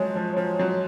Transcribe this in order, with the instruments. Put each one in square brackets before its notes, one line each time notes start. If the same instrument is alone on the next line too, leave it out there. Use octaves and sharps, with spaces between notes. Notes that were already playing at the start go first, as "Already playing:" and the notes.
Already playing: [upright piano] F3 F#3 G#3 [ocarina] C#5
[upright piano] F3
[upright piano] F3 [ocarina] C#5
[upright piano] F#3